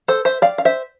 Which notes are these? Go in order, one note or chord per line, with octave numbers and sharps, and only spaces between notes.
A4 C5
C5 E5
D5 F5
F5
C5 E5